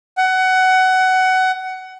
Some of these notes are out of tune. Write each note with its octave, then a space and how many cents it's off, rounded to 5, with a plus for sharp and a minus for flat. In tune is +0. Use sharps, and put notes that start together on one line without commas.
F#5 +20